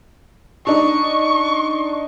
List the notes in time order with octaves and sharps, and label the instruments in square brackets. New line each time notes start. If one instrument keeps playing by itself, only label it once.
[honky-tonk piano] D4 D#4 [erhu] C#6